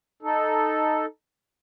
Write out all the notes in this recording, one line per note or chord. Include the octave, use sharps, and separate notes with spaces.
D#4 A4